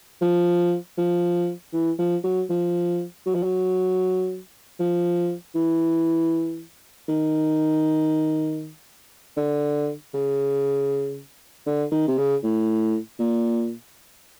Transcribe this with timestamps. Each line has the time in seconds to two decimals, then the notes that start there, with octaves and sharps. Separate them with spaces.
0.21 F3
0.98 F3
1.73 E3
1.98 F3
2.24 F#3
2.50 F3
3.26 F#3
3.35 F3
3.43 F#3
4.80 F3
5.55 E3
7.09 D#3
9.37 D3
10.14 C#3
11.66 D3
11.92 D#3
12.08 C3
12.18 C#3
12.43 A2
13.19 A#2